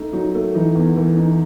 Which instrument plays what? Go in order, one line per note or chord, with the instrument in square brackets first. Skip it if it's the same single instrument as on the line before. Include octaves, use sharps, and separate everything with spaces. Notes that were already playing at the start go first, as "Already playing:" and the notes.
Already playing: [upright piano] A3 D#4
[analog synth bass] F#3 [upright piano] D#4
[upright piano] A3
[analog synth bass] E3 [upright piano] D#4
[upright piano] E2
[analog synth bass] E3 [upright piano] A3
[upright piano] D#4